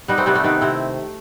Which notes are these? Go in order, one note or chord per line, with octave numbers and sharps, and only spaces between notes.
G3 B3 D#4
A3 C4
C3 G3 B3
A3 C4
D#3 B3 D#4
C3 C4 E4